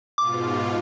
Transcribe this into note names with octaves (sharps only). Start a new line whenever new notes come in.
G#2 B2 F4 D6